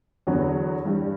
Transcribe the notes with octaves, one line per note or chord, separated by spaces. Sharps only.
E2 D3 F#3 B3 F#4
G2 E3 G3